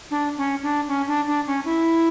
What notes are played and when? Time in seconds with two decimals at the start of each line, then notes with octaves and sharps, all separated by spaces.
0.10 D4
0.37 C#4
0.62 D4
0.87 C#4
1.07 D4
1.27 D4
1.46 C#4
1.64 E4